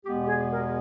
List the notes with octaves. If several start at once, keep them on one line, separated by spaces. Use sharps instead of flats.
E2 B2 G#3 B3 G4
G4
G#4
A#4